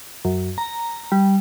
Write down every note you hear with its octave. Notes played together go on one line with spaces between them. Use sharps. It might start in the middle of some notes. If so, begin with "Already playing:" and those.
F#2
A#5
G3